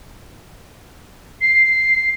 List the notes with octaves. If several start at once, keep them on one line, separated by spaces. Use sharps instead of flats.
C7